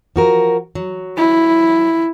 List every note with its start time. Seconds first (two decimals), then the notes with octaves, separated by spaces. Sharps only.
0.16 F3 F#4 A#4
0.75 F#3
1.17 E4